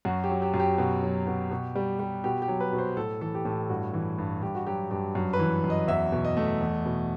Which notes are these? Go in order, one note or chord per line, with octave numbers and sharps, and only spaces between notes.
F#2 F#4
G4
F#3
G4
F#2
G4
B2
F#3
B2
B2
G3
G3
B2 G4
G4
F#3
B4
B2
C5
A2 A4
E3 A4
G4
A2 A4
G2 F#4
E3
G2
G2 G4
F#4
F#3 G4
G2 G4
F#2
B4
E3
F#2
D#5
E2 E5
B2
D#5
A3
E2
B2